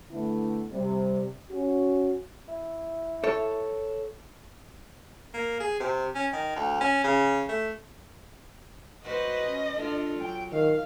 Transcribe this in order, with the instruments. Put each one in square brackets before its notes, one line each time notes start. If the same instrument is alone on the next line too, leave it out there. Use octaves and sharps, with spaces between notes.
[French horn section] D3 A3 B3 E4
C3 G3
C#4 F#4
[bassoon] E4
[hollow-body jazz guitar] A4 C#5
[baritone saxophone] A#3
G#4
C3
C#4
D#3
D2
C#4
C#3
A3
[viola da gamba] F#4 B4 C5 [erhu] D#5
[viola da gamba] C#4
D4 F4 A4
[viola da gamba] F#3 [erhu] G5
[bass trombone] D#3 [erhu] F5